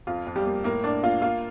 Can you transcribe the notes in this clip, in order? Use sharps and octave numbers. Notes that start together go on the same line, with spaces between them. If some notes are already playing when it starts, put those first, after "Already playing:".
F2 F4
F2
G3 G4
A#3
A2 A#3 A#4
A2 D4 D5
A#3 F4 F5
A#3 F4 F5